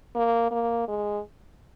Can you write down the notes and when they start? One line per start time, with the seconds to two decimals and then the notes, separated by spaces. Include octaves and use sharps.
0.15 A#3
0.51 A#3
0.88 G#3